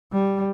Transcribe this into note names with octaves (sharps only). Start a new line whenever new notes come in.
G3